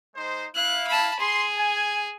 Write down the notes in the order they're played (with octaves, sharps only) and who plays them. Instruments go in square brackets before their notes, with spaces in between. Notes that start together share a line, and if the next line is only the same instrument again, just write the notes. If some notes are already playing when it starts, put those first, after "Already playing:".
[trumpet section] G#3 D#4 C5
[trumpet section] E4 F5 [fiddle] F#6
[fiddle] A5 B5
[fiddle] G#4 [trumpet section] C6
[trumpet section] G#5